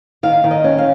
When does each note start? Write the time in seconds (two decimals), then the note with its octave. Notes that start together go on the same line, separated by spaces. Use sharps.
0.23 D#3 F5
0.44 D#3
0.51 D#5
0.64 C#4
0.78 F5